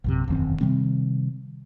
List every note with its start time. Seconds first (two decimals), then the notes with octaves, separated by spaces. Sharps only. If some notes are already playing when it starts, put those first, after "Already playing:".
0.04 A#1 F#2 C3
0.28 E1 F#2 D#3 C4
0.61 C3 D#3 G3 C4